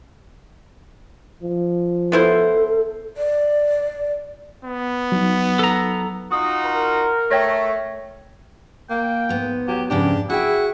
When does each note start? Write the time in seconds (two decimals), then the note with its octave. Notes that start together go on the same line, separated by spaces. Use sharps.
1.43 F3
2.12 B3 E4 A4 C5
3.17 D5
4.65 B3
5.12 F#3 D#4
5.59 A4 A#5
6.32 D#4 F4 F#4 D#6
6.65 A#4
7.31 A3 C#5 G5 G#6 A#6
8.90 A#3 G5
9.29 G#2 B3
9.68 F#3 G4
9.90 F2 G#2 C#3 D4 G4
10.30 E4 F#4 G#4 G5